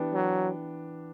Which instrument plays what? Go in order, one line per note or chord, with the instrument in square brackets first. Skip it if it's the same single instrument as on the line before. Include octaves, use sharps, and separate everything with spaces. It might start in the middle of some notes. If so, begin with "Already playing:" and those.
Already playing: [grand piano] E3 B3 D4 G4
[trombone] F#3